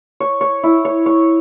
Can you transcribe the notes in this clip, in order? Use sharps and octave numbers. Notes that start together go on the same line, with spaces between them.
C#5
C#5
E4
C#5
C#5